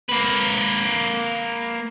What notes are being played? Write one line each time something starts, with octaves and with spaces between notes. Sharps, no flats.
A#3 B4